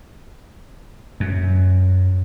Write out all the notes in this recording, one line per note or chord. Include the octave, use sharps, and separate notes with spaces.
F#2